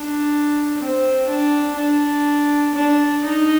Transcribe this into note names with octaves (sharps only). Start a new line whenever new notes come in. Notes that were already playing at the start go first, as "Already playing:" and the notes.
Already playing: D4
C4
D4
D4
D4
D#4